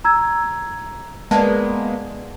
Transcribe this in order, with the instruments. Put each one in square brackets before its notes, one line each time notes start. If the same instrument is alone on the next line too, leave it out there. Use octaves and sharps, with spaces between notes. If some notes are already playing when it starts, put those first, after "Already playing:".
[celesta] A#5 E6 G#6
[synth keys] G#3 A#3 B3 [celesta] D5 A5